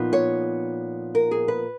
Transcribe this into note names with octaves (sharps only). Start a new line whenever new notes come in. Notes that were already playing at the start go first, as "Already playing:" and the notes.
Already playing: A#2 F3 B3 D#4
C#5
A#4
G#4
B4